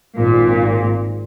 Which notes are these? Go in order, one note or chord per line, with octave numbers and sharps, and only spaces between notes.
G#1 A#2